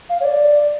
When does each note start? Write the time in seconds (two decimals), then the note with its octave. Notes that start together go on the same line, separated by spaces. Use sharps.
0.09 F5
0.20 C#5
0.24 D5